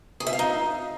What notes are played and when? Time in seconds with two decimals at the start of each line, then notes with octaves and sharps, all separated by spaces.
0.20 G#4
0.27 E5
0.33 F5
0.39 D#4